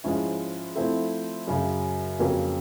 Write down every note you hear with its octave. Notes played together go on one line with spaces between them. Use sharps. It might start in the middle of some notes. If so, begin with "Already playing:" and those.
G#2 F3 G#3 C#4 E4
F3 A3 C4 E4 A4
F#2 C#3 F#3
F2 C#3 F#3 A#3 C#4